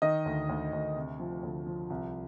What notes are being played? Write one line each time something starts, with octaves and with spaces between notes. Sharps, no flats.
D#3 D#5
D2
D2
D2
C3
F3
D2
F3
C2